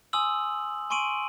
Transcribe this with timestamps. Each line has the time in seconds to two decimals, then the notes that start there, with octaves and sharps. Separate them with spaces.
0.13 G#5 C6 D#6 E6 F#7
0.90 G#5 C6 C#6 D7 D#7 F#7